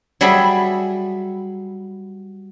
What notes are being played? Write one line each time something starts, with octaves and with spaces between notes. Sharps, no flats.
F#3 G3 G#4 E5 B5